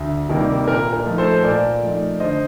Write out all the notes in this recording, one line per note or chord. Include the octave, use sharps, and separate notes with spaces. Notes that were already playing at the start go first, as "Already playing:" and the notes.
Already playing: D2
C3 D#3 G3 A#3
A#2 A#4
A#4
F3 A3 D#4
A4 C5
A#2 A#4 D5
F3 A3 D#4
D3 C5 D#5